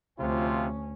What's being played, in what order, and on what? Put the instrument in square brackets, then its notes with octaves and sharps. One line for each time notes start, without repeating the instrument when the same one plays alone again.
[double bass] D2 C#4 [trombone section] C3 F3 F4